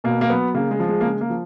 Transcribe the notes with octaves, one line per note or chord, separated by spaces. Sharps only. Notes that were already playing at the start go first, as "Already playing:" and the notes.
B2 A#3
A#3
F#3 B3
C#3 A#3
G#3
F3
G#3
A#3
C#3 G#3
A#3
F3